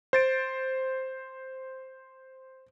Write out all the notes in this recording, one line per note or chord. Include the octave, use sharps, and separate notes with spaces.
C5 A6 D7